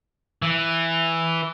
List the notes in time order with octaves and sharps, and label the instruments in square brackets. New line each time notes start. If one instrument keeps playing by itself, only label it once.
[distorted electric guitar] E3